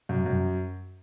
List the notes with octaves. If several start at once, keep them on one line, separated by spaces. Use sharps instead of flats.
F#2
F#2